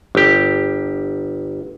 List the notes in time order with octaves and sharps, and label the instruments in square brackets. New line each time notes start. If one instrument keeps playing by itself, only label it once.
[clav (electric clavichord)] G1 G4